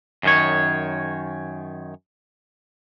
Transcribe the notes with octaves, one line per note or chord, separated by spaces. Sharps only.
F#2 D#3 C#5